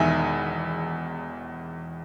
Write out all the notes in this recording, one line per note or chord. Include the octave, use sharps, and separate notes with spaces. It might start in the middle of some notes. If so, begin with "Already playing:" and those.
Already playing: E1 E2 D#3 E5 G#5